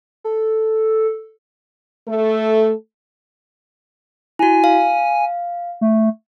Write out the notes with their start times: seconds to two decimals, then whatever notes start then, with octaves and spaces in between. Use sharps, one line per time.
0.24 A4
2.08 A3 A4
4.39 E4 F#4 G#5
4.64 F5
5.81 A3